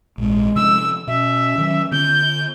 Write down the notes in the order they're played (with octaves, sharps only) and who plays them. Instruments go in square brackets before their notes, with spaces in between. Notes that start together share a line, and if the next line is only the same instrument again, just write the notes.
[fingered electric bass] A#1 G#2 [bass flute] G#3
[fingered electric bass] C3 F3 C#4 [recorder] E6
[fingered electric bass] B2 [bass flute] C#4 [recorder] E5
[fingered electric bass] D#3 F#3
[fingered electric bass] D3 B3 [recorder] G6